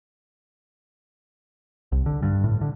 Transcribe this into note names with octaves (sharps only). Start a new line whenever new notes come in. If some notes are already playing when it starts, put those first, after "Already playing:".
C2
D3
G2
A2
D3